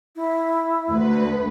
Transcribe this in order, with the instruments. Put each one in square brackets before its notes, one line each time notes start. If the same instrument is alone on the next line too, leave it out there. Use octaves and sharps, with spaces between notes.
[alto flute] E4
[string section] D2 B4